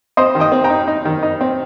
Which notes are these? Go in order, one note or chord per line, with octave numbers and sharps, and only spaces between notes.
C4 C5 D#5
D#3
D#5 G5
C4
G5 A#5
D#4
D#4
D#3
D#4
C4